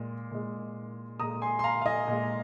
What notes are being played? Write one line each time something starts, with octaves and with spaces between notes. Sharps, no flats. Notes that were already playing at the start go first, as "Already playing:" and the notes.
Already playing: A#2 G#3
A#2 G#3
A#2 G#3 A#5 D#6
G#5 C6
C6
F5 A#5
F5
D#5 G#5
A#2 G#3